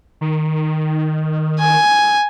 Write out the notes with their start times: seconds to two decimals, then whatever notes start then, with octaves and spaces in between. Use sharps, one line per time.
0.21 D#3
1.59 G#5